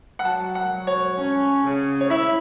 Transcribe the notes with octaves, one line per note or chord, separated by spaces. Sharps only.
F#5
F#3 A5
F#5
F#3
C#5
C#4
C#3
C#5
E4 E5